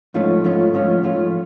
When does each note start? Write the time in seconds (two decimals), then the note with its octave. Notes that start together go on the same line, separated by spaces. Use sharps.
0.14 G#2 F3 A3 C#4 F4
0.44 G#2 F3 A3 C#4 F4
0.74 G#2 F3 A3 C#4 F4
1.03 G#2 F3 A3 C#4 F4